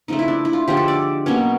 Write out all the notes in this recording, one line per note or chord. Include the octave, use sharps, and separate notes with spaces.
C#3 F3 A3 D#4
E4
D4
E4
F4
D3 F3 G#3 G4
A4
D5
B2 F#3 A#3 C#4 C#5